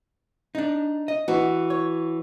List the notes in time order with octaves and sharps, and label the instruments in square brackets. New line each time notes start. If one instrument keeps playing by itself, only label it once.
[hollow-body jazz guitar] D4 D#4
D#5
[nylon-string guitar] E3 F#4
[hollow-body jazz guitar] C#5